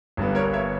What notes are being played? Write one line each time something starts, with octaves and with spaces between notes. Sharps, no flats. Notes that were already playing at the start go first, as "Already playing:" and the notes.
G1 G2 G3 B3
A#4 C#5
C#5 E5